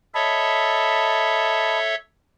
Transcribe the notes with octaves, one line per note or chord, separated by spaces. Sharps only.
A4 C#5 D#5 E5 A5 B5